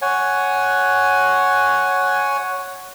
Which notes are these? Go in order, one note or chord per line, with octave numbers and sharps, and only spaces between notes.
C#5 F#5 G#5